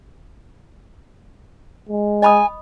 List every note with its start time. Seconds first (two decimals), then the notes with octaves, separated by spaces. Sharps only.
1.89 G#3
2.22 D#5 G#5 B5 D#6